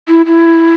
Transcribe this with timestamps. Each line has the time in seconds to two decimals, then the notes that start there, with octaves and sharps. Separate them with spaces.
0.08 E4
0.26 E4